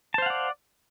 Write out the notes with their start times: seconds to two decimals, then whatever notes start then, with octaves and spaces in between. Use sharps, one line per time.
0.14 A5
0.18 C5
0.22 F5
0.26 F#5
0.30 D5